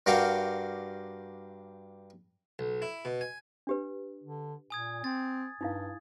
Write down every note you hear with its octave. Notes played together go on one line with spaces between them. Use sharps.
G2 F#4 A#4 F5 G5 D6
B1
E4
B2
G#5
D4 G4 B4
D3
A#2 G#5 D#6 G#6
C4 A6
G2 D#4 E4 F5